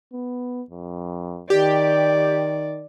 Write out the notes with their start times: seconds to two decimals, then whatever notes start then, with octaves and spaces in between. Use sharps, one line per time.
0.13 B3
0.70 F2
1.50 D#3 G4 D5